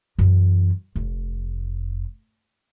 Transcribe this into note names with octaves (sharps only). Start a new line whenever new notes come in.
F#2 E3
F1